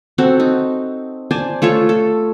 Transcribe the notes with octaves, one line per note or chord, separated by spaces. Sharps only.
C4 F#4 A4
D#4
C5 D5 G#5 A5
A3 F4 A4 C#5
A4